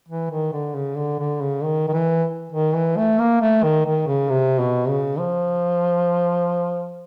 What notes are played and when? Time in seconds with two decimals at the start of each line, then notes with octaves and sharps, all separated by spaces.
0.08 E3
0.31 D#3
0.53 D3
0.75 C#3
0.97 D3
1.19 D3
1.42 C#3
1.63 D#3
1.88 D#3
1.93 E3
2.52 D#3
2.74 E3
2.97 A3
3.19 A#3
3.41 A3
3.63 D#3
3.85 D#3
4.07 C#3
4.29 C3
4.59 B2
4.88 C#3
5.19 F3